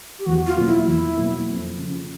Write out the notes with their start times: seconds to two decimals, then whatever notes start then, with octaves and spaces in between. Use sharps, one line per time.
0.19 G4
0.26 E2 F#4
0.46 F4
0.56 B2 F#3 A#3
0.66 E4
0.87 E2 E4
1.17 B2 F#3 A#3
1.47 F2
1.78 C#3 F3